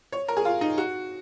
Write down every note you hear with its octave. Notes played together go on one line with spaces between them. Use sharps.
C#5
A#4
G#4
F4
D#4
F#4